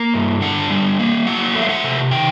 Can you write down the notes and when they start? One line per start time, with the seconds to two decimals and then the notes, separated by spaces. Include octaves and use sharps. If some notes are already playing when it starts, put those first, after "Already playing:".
Already playing: A#3
0.14 G2
0.41 D3 F#5
0.70 G3
0.99 A#3
1.27 F#3 F#5
1.55 A3
1.62 F5
1.69 F#5
1.83 C3
2.11 D#3 G5